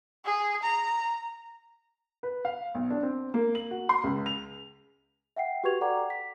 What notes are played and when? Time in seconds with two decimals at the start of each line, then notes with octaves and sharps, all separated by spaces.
0.25 G#4
0.63 A#5
2.23 B4
2.45 F5
2.75 B1
2.90 D4
3.03 C4
3.34 A#3
3.55 F#7
3.71 F#4
3.89 C6
4.04 C#2
4.26 F7
5.36 E5 F#5 G5 C7
5.64 F#4 G4 B4 C#6 G#6 F7
5.81 A4 D5 F#5 G5 A#5 D6
6.10 B6